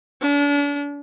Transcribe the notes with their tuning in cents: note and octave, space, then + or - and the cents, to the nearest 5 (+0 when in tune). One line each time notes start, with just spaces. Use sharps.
D4 -40